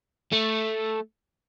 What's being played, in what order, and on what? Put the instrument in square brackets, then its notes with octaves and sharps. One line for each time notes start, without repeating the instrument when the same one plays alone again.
[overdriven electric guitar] A3